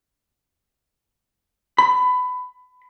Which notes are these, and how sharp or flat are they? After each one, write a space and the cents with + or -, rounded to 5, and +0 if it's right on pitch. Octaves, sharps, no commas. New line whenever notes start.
B5 +20